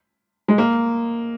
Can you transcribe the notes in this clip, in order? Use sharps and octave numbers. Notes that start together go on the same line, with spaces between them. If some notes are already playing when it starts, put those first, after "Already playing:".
G#3
A#3